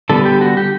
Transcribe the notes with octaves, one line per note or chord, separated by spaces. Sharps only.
D3 G3 B3 A4
G4
F#4
G4